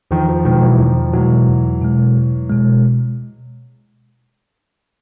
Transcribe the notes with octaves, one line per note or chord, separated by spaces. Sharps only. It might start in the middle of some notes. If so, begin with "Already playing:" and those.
E2 D#3 F3
D#3 F3
B2 D#3 F3 G#3
F3
E3 F#3
E2 D#3 F3
B2 E3 F#3 G#3
E2
B2 G#3
E2
B2 G#3